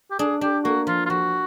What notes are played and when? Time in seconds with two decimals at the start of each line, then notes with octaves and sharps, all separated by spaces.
0.11 G4
0.19 D4 G#4
0.41 D4 G4
0.64 A#3 F#4
0.87 F3 F4
1.06 F4
1.10 F3 F#4